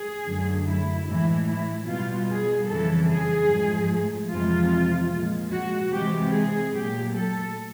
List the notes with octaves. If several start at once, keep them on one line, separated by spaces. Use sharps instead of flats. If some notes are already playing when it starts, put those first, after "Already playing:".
Already playing: G#4
F#2 D3 F#3 A3
E4
A2 E3 G#3 E4
E4
B2 G3 F4
G#4
F2 C#3 E3 G3 A4
G#4
G#2 F3 A3
F2 C3 E3 G#3 F4
A#2 F3 G#3
F#4
C3 E3 G#3 G4
G#4
A#2 F#3 A3 G4
A4